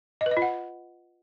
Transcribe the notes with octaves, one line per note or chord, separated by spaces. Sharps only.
D#5
B4
D#5
F4
F#5